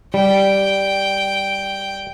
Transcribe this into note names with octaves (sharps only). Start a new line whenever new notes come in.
G3 G5